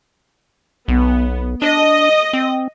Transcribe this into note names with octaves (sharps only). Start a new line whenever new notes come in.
B1 B3
D4 D#5
C4